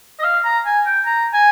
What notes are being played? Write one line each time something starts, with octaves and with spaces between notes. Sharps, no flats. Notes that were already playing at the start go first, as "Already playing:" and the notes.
D#5
F5
A#5
G#5
G5
A#5
G#5